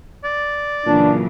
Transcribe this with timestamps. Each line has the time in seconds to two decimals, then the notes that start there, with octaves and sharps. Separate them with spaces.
0.24 D5
0.86 A#2 C#3 E3 F#3 D4